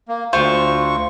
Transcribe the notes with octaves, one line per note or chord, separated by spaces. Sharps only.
A#3
D2 F4 C5 C#6